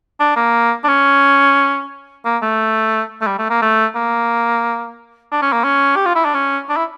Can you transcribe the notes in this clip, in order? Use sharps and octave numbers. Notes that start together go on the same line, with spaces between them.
D4
A#3
D4
C#4
A#3
A3
A3
G3
A3
A#3
A3
A#3
D4
C#4
A#3
C#4
G4
F4
E4
D4
C#4
D4
E4